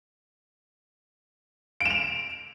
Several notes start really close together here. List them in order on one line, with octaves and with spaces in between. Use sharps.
D7 E7 F7